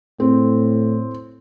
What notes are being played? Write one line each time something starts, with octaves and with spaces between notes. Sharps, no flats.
A2 C4